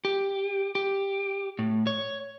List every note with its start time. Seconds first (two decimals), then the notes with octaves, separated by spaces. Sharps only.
0.05 G4
0.75 G4
1.59 A2
1.87 C#5